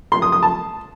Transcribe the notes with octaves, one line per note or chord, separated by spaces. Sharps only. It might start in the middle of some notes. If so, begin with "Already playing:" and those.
C6
D#6
D#6
A5